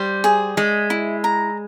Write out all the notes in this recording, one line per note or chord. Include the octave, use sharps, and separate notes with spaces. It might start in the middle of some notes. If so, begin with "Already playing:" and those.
Already playing: G3 C5
G#4
G#3 E5
E4
A#5